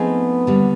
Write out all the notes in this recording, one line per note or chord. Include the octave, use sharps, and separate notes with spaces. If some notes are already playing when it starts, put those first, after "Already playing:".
Already playing: F3 A3 B3 C4 D#4 G#4
D#2 D3 G3